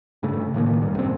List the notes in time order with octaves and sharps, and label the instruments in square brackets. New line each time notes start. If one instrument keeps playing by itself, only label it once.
[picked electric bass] G2 C#3 A3
A2 D#3 A3 A#3
F#1 G2
C2 F#2 C4